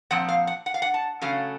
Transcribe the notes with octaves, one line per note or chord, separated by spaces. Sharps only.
A#2 F3 C4 F#5
F5
F#5
F#5
F5
F#5
A5
C#3 F#3 A3 C#4 F5